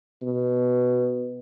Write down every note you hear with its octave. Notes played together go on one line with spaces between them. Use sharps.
B2